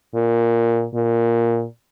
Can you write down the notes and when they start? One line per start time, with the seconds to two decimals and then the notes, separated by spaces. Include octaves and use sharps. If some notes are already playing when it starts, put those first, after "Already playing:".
0.15 A#2
0.95 A#2